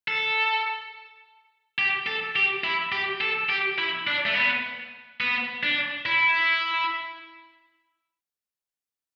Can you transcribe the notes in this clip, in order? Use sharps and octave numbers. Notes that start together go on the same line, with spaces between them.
A4
G4
A4
G4
E4
G4
A4
G4
E4
D4
A3
B3
B3
D4
E4